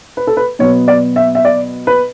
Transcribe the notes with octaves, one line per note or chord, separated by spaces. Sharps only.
B4
A4
B4
B2 F#3 B3 C#5
D5
E5
E5
D5
B4